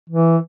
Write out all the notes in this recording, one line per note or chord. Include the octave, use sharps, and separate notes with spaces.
E3